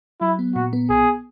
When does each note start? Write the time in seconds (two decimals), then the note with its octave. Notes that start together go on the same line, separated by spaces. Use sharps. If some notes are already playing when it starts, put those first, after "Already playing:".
0.21 F#3 E4
0.39 B3
0.55 A#2 F#4
0.73 B3
0.89 B1 G#4